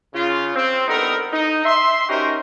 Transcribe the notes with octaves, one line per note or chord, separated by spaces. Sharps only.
C#3 F4
C4
G2 B3 D#4 A4 A#4
D#4
E5 C6
C#4 D#4 F#4 G4 A#4 C5